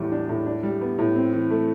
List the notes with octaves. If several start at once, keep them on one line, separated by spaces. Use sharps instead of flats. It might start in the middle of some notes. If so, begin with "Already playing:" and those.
Already playing: E2 A2 G3
D4
A2
D4
G3
B3
A2
C4
E3
A3